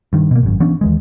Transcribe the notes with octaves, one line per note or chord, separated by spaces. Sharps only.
G2 D#3
B2 A#3
G#1 F#2
E3 B3 C#4 D4
D#2 E3 G#3